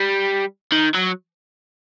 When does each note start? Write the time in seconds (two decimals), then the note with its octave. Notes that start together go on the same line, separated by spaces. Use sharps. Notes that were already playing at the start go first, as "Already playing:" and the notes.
Already playing: G3
0.72 D#3
0.95 F#3